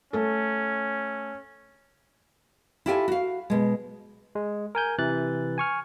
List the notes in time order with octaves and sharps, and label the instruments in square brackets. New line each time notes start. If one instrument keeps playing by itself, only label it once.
[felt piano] A3 A4 [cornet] C#4
[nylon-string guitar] E4 F4 G4 A4 G5 G#5
F#4 F5
B2 G#3
[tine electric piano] G#3
A#4 G#5 G6
C3 E3 F#6 A6
G#5 C#6 F6